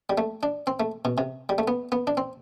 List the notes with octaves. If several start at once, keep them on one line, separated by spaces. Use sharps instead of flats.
G3
A3
D4
C4
A3
B2
C3
G3
A3
B3
B3
D4
C4